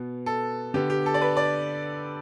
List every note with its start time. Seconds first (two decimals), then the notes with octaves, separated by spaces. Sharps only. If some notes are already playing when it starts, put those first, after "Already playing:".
Already playing: B2 B3
0.26 A4
0.74 D3 B3 G4
0.90 G4
1.06 A4
1.14 D5
1.21 B4
1.37 D5